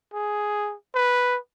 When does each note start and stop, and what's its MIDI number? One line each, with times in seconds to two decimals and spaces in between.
0.14 0.75 68
0.95 1.38 71